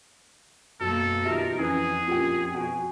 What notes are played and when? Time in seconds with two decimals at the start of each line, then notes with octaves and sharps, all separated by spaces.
0.81 F#2 B2 A#3 A4
1.25 D#3 F4 G4 A#4 E5
1.59 F2 E3 C#4 G#4 B4
2.07 A#2 C#4 G4 G5
2.55 B2 F#4 G5 G#5